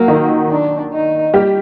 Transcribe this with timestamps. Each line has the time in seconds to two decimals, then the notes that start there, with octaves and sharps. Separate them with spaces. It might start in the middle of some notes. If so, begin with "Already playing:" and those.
Already playing: F#3 A#3 F#4
0.08 D#3 D#4
0.50 D4
0.92 D#4
1.34 G3 G4